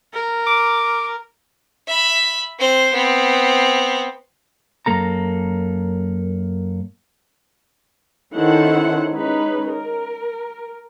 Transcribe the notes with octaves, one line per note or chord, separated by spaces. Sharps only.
A#4
D6
E5 B5
C4 C5
B3 C4
F#2 A#3 A4 A#5
D#3 C#4 E4 A4 C5 F#5
G#3 C#4 D#4 B4
A#4